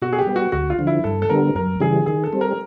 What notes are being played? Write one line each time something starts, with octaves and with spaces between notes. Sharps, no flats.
B2 F#4
G#4
G4
G3 B3
F#4
D2 F#4
F4
D3 F3
E4
G2 A4
A4
D3 G3 B3 A#4
F#2 A#4
C#3 E3 G3 G#4
D#3 G#4
A4
G3 C4
A#4